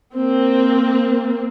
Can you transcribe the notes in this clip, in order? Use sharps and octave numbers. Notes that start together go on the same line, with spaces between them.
A#3 C4